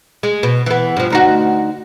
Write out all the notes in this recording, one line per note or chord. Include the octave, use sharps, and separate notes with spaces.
G#3
B2
E3 B3
G2 F3
D2 D#4 F#4